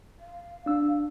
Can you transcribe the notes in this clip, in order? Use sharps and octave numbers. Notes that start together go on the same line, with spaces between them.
F5
D4 E6